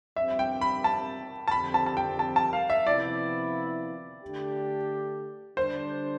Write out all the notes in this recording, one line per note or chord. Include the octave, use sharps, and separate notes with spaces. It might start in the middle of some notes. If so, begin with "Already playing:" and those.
G2 F3 C4 G4 E5
G5
B5
A5
A5
F2 D3 F3 C4 G4 B5
A5
A5
G5
A5
A5
F5
E5
C3 F3 B3 E4 D5
D3 A3 D4 G4
D3 G3 D4 C5